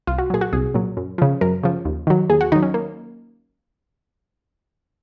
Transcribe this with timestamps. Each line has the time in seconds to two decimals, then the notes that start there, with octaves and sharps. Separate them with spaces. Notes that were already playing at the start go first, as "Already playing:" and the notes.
0.07 C2 F4
0.18 F#4
0.30 A#2 F#3 G#4
0.41 F#4
0.52 C2 G#4
0.74 A#2 F#3
0.97 F#2
1.18 C#3 F3
1.41 F#2 A#4
1.63 C#3 F3
1.85 D#2
2.07 D#3 F#3
2.29 D#2 G#4
2.41 F#4
2.52 D#3 F#3 D#4
2.63 C#4
2.74 A#3